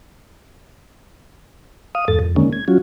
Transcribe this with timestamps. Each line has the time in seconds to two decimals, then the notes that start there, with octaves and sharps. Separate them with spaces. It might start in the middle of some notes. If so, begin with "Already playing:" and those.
1.95 F5 D#6
2.08 E2 G#2 A4 A6
2.20 F2
2.36 D3 D#3 G#3 A#3 C#4
2.53 G#6
2.68 F#3 C#4 F4 F#4